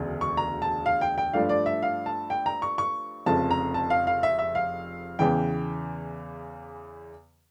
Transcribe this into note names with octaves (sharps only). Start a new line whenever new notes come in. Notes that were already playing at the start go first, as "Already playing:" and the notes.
Already playing: E1 D2 C#3
C#6
A#5
A5
F5
G5
G5
G2 F3 A3 D4 F5
D5
E5
F5
A5
G5
A#5
C#6
C#6
F1 F2 C#3 F3 A5
A#5
A5
F5
F5
E5
E5
F5
E2 C#3 E3 G5